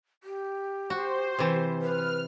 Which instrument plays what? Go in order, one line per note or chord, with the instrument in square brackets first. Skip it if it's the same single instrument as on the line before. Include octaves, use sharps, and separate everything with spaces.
[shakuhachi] G4
[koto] F#4 [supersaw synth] C5
[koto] C3 E3
[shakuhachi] B4 [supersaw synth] F6